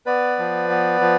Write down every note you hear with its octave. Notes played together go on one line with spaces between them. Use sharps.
B3 B4 D5
F3
B3
F3